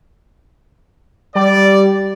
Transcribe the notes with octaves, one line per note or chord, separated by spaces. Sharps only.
G3 D5